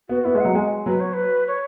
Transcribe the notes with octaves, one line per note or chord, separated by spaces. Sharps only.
B3 F#4
B3 E4
G#3 E5
F#3 F#5
G#3 G#5
F#3 B4
C#5
B4
C#5